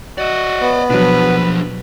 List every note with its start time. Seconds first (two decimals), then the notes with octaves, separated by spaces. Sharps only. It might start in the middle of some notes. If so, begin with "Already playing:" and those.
0.18 F#4 D5 D#5
0.61 B3
0.90 B2 F3 F#3 D4 B4